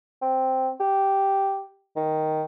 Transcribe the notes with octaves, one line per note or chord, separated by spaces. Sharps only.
C4
G4
D#3